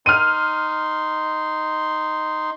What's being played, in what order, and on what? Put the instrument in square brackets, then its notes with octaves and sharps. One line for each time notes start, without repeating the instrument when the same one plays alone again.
[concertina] D#4 C6 [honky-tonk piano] F6 D#7